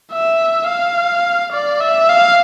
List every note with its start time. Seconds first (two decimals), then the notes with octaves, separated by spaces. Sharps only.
0.13 E5
0.68 F5
1.53 D5
1.80 E5
2.09 F5